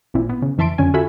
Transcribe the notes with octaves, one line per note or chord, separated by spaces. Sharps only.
A1 A#2 C4 E4
B3
C#3
F2 E3 E5 A5 C6 D7
F2 D3 C#4 G#5
F4 F#4 A4 E5 G#5 B5